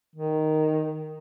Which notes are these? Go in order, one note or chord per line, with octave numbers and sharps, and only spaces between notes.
D#3